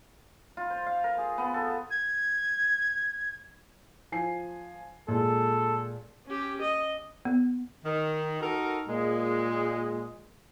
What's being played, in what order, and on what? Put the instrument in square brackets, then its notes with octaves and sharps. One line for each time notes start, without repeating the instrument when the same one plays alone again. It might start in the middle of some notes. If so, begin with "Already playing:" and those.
[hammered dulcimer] F4
C5
F5
A#4
G#4
B3
A4
[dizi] G#6
[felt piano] F3 G#5 C7
[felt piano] A#2 G#3 [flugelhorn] A4
[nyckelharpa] C#4 G4
D#5
[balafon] B3
[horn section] D#3
D#4 F#4 A4 A#4
A#2 G#3